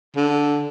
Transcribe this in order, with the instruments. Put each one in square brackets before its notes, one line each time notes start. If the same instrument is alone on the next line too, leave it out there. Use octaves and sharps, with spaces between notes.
[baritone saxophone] D3